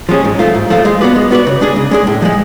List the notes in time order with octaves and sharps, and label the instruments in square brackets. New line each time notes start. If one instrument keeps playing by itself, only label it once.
[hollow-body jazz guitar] F3 G#3 C#4 G#4
G#2
F3 A3 F4
G#2
F3 A3 F4
G#3
B3 F#4 B4 D5
G#3
B3 F#4 B4 D5
C#3
G#3 D4 G#4
C#3
G#3 D4 G#4
A2
F3 G#3